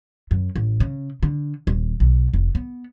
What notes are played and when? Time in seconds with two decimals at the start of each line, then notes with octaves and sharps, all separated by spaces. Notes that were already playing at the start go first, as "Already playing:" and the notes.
0.31 F#2
0.56 A1
0.80 C#3
1.23 D3
1.67 D#1
2.00 B1
2.34 F1
2.55 B3